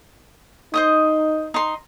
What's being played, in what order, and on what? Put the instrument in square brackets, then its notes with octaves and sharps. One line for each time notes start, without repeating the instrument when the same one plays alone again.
[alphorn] D#4 [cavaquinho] C5 D#5 D#6
[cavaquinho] D#4 C6